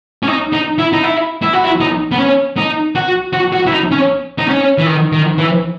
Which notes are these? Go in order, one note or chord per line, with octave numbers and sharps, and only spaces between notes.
C#4
D#4
D#4
E4
D#4
E4
E4
F#4
E4
D#4
B3
C#4
D#4
F#4
F#4
F#4
E4
D#4
C#4
D#4
C#4
E3
D#3
D#3
E3